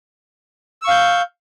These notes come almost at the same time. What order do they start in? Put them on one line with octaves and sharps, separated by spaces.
E6 C#6 F5 G6